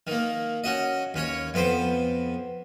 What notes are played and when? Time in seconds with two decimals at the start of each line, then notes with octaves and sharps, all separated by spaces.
0.07 D#3 A#3
0.64 C#4 F#4 D#5
1.14 D#2 C#4 C#5
1.54 F2 B3 C5 G5